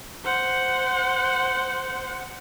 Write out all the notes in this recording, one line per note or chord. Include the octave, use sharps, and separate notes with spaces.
C5 F#5